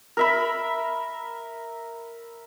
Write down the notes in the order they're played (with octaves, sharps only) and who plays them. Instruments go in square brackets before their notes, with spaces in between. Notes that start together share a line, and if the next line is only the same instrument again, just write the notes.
[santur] A#4 E5 B5